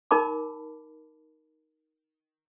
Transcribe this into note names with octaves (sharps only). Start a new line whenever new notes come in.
D#4 A#4 A5 B5 D6